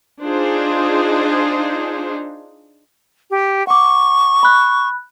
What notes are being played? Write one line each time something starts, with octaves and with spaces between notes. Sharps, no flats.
D4 D#4 F4 G#4 C5
G4
F#5 C#6 D6
B5 F#6